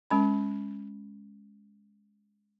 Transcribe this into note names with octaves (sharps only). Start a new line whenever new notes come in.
G#3 C#4 B5